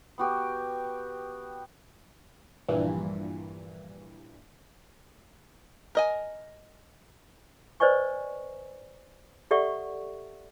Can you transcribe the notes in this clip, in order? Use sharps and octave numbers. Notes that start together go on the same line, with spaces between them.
B3 F#4 G4
A#1 G2 A#2 E3
A#4 D#5 G#5
B4 C5 D5 D#5 G#5 C#6
G4 A4 D5 E5 F#5 C#6